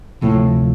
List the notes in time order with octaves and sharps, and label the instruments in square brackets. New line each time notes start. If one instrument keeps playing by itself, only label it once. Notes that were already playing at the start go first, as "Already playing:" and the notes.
[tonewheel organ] D2 C3 F3 [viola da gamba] A2